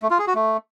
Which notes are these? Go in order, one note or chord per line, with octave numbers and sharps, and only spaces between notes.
A3
F4
G#4
F#4
A3